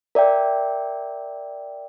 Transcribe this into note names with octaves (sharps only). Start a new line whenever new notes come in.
A#4 D5 E5 G5